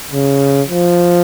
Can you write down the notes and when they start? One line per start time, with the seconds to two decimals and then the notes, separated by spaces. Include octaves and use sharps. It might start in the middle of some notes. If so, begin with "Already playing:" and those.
0.11 C#3
0.67 F3